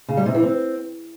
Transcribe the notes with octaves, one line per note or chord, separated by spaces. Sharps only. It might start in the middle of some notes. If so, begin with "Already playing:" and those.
C#3
G3
C3
E3
C4